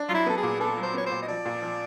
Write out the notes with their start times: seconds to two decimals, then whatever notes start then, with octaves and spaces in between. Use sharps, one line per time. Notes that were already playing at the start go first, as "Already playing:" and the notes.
Already playing: D4
0.09 F#3 F4
0.14 E4
0.26 B3 A4
0.37 G#4
0.43 A#2
0.60 B3 A4
0.77 F#3
0.83 C5
0.94 B3 C#5
1.06 C5
1.11 A#2
1.22 D#5
1.28 F3 D5
1.45 A#2
1.62 F3